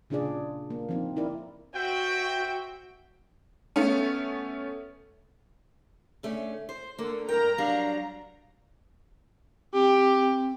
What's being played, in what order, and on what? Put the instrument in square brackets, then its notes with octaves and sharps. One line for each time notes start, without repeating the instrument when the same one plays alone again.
[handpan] A#2 C#3 D4 F4 G#4 D5
A#3
F3 C4 D#4
D#4 E4 A#4 D5
[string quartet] F#4 [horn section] C5 E5 G5
[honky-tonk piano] A3 B3 C#4
[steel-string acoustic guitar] D3 A3 C#4
C5
[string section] D3 [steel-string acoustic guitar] A#3
[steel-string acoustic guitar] G2 G5 [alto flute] A#4 [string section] A#5
[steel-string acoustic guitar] F#3 G3 D4 [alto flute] F5
[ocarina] C4 [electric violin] G4